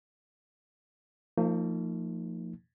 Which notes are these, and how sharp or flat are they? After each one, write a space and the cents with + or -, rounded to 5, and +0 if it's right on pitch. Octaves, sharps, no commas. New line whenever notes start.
F3 +0 A#3 -40 D#4 +15